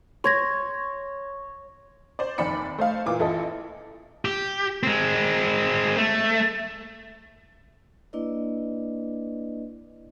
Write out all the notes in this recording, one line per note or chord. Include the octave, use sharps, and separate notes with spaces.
C#5 C6 G#6 A#6
C5 D5
F1 D#2 D5 B5 C#7
A3 C5 D#5 F5
A#2 E3 F4 D6
A1 E4 F4 A4 D#5
G4
G#3 C4
A3
A#3 D4 E4 B4 D5 D#5